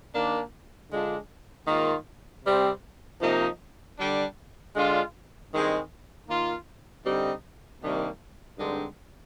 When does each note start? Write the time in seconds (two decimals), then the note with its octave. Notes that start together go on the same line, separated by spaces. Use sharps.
0.14 D#3 A#3 D4
0.91 D3 G#3 D4 F4
1.67 G#2 D#3 A#3 F4
2.44 C3 G3 C4
3.20 C3 F3 A#3 D#4
3.98 D3 G3 D4
4.75 D3 G#3 D4 F4
5.51 G2 D#3 G#3 C4
6.28 D#3 A#3 F4
7.05 D3 G3 C4 D#4
7.82 C3 D#3 G3 A#3 D4
8.58 G2 D3 G#3 C4 D#4